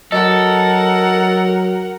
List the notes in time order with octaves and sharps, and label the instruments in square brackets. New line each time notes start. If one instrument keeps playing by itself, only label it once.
[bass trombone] F#3 [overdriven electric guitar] A4 [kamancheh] A#4 F#5 [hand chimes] D#5